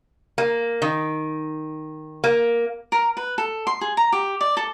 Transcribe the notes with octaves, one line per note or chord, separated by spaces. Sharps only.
A#3
D#3
A#3
A#4
B4
A4
C6
G#4
A#5
G4
D5
A4